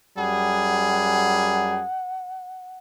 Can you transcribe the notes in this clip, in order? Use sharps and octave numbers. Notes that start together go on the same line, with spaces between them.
F#2 G3 G#4 F#5